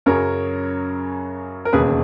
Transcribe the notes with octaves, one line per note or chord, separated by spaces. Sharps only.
F#2 C#3 F#3 A#4 C#5
A#4
E1 D#2 C#3 G#4 B4